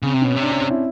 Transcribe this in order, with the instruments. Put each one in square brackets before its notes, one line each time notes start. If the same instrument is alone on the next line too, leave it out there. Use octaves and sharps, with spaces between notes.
[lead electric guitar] C#3 [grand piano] C4
[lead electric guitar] C3
[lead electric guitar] B2 [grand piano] C#4
[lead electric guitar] C3
[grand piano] D4
C#4
C4
E4